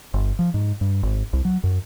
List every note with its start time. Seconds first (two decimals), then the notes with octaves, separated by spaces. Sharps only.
0.14 G1
0.39 F3
0.54 G#2
0.81 G2
1.03 G#1
1.33 C2
1.45 F#3
1.63 F#2